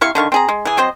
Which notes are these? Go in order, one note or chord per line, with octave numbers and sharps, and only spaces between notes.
C3 E4 F5 C#6
D3 D#3 F5 C#6
C4 G#4 A#5
G#3
E3 G#4
F#3 C4 C5 D#5